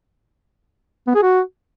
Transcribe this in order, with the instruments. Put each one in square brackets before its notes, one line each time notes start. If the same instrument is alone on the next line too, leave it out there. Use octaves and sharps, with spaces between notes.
[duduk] B3
G#4
F#4